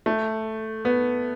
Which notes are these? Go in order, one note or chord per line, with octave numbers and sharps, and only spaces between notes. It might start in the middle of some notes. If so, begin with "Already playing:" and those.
A3
B3